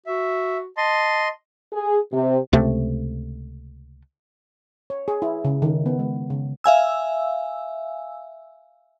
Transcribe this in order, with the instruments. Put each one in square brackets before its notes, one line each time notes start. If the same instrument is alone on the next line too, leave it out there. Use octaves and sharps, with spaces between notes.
[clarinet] F#4 [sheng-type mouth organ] E5
[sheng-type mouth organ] D#5 C6 [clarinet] A5
[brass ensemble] G#4
C3
[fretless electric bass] C#2 C3 A3
[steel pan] C#5
G#4
E4
C#3
D#3
B3
G#3
C#3
[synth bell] E5 F5 G#5 E6